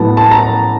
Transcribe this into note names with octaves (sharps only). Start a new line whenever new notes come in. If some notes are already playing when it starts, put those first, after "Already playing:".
Already playing: A2 F#3 B3 A5
A5
A#5